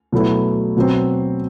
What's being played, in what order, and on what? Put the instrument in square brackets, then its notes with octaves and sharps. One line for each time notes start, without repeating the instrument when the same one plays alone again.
[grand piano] B2 F#3 A3 E4
B2 F#3 C4